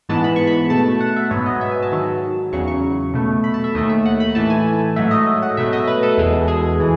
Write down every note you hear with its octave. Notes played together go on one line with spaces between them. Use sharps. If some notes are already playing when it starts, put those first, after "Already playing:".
G#2 E3 G#3 B3 A5
B5
C#6
B5
B2 A3 A5
F#5
E5
G#2 F#3 B3 C#5
D#5
E5
G#5
A5
G#2 D#3 F#3
E2 C#3 F#3 C#6
C#6
B2 A3
B5
A5
E5
D#2 D#3 A3 D#5
E5
F#5
B5
A2 E3 A3 A5
G#5
G#2 F#3 A3 E5
D#5
D#5
F#5
B2 F#3 A3 E5
D#5
B4
A4
E2 B2 G#3
G#4
E3